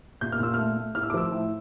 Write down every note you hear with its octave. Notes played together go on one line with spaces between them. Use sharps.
A#2 G6
F6
A#2 E6
A3 F6
A3
A2 F6
E6
D6
F3 E6
A2